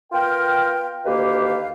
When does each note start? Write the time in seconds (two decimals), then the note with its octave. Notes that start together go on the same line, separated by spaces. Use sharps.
0.12 B3 F4 A#4 G5
1.05 D2 D#3 A#3 G4 B4 F5